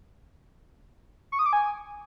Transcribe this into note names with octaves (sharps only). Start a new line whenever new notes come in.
C#6
D#6
D6
G#5